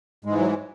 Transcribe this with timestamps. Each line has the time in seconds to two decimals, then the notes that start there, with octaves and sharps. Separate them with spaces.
0.25 G#2 G#3
0.30 E3
0.38 F#3